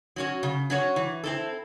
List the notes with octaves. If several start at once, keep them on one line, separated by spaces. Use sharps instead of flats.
F#3 C#4 F#4 C#5
C#3
F#3 C#4 F#4 C#5
E3
C4 E4 A4